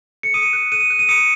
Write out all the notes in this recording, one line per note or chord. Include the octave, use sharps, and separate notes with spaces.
C#7
D#6 D#7
F#6
F#6 D#7
F#6
D#7
D#6 C#7